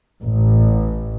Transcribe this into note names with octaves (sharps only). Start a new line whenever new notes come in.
A1